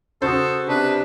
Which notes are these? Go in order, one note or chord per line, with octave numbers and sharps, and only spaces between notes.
C#3 F#4 A4 C5 D#6
C3 D4 B4